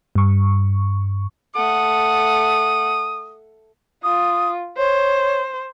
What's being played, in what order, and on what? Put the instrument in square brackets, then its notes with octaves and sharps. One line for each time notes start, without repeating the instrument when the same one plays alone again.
[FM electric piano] G2 C#6
[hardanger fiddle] A3 F#5 [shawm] D#6
[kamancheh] F4 [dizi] D#6
[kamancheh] C5 [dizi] C#5